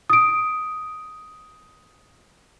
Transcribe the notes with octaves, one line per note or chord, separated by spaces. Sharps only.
D#6 D7